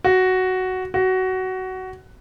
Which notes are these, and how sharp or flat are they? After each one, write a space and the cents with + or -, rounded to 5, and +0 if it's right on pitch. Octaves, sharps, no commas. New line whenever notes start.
F#4 +5
F#4 +15